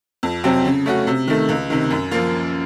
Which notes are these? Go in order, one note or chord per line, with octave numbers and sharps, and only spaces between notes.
F2
C3 F#3 C4
C#3
A3 C#4 F#4
C3
D#3 A3
C#2
C3 D#3
F#2
F3 A#3 F4